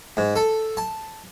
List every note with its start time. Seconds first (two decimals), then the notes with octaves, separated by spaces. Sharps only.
0.17 G#2
0.36 A4
0.77 A5